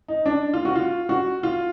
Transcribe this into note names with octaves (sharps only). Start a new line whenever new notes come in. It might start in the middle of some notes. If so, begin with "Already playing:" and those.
D#4
D4
F4
F#4
F4
F#4
F4